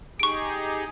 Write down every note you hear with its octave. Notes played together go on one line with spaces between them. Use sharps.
D#4 G4 G#4 C#6 D7